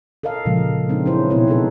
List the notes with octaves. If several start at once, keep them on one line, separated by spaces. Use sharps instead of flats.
A4 A#4 D#5 F5
A#2 C#3 F3 G#3
G#3 C4 D4 D#4
F#3 C#4 E4 B4 C5
B2 B3 C4 E4 B4 C#5
D#4 G#4 A4 B4